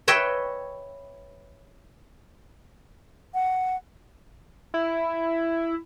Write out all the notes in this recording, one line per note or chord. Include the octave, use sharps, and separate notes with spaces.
B4 C#5 D#5 E5 G5
F#5
E4